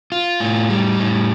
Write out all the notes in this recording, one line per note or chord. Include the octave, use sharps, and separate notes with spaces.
F4
A2
G3
A2